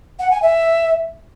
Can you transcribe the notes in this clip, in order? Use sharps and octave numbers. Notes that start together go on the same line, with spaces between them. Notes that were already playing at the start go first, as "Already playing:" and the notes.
F#5
G#5
E5